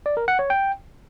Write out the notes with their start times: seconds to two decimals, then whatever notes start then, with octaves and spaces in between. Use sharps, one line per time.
0.06 D5
0.17 A#4
0.28 F#5
0.39 C#5
0.50 G5